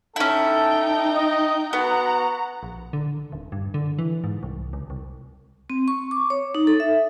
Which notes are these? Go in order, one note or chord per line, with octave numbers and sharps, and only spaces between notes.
C#4 D#4 E4 A4 G5
D#5
B3 F#4 F#5 A#5
A#1
D3
D#1
G2
D3
E3
G#2
C2
C#2
C2
C4
C#6
D6
C#5
D#4
A4
E5